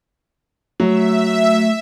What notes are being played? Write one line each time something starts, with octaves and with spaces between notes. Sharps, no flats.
F#3 A3 E5